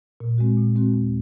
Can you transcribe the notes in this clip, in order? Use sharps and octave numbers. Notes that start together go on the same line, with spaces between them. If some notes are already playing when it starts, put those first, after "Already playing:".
A#2
G#3 C4 F#4
A#2
G#3 C4 F#4
D#2